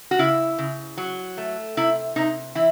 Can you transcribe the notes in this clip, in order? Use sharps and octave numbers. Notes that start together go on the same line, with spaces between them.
F#4
C#3 E4
C#3
F#3
A3
C3 E4
C3 D#4
E3 E4